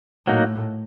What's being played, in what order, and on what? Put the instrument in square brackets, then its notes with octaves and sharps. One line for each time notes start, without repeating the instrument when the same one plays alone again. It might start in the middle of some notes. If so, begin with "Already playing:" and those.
[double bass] A2 [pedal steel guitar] F#3 A#3 D#4 F#4